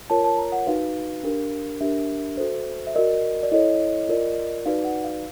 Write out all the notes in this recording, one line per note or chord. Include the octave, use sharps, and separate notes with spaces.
F4 A#4 C#5 A5
A5
A#5
F#5
D#4 F#4 B4 F5
D4 G4 A#4
D4 G4 A#4 E5
F#4 A4 C5
E5
F#4 A#4 D5 D#5
D5
E4 A4 C#5 D#5
F4 A#4 D5
D#4 F#4 B4 D5 F5
F#5
F5